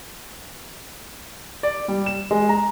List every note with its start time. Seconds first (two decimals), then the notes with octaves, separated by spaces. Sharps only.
1.63 D5
1.88 G3
2.06 E7
2.31 G#3
2.49 A#5